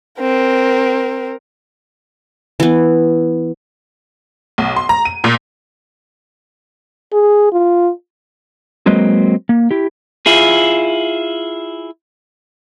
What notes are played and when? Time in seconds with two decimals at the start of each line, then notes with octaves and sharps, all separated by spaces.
0.20 C4 A#4
2.60 E3 B3
4.58 B1
4.76 C6
4.89 A#5
5.05 D#7
5.24 A#2
7.13 G#4
7.53 F4
8.86 F#3 G#3 A#3 C4 B4 D#5
9.49 A#3
9.71 E4 G4
10.26 E4 F4 G#4